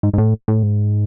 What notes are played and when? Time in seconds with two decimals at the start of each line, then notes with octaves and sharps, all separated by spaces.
0.03 G#2
0.13 G#2
0.18 A2
0.48 A2
0.63 G#2